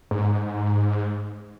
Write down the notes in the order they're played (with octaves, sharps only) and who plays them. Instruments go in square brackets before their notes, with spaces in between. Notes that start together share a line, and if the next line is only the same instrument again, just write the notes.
[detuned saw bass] G#2